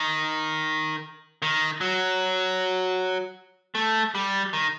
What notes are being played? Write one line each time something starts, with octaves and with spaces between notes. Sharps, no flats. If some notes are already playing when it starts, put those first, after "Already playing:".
Already playing: D#3
D#3
F#3
A3
G3
D#3